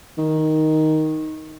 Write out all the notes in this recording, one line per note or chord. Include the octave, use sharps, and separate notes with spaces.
D#3